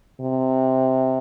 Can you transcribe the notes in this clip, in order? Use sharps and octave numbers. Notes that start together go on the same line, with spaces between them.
C3